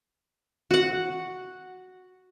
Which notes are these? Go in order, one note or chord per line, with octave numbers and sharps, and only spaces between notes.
F#4 F#5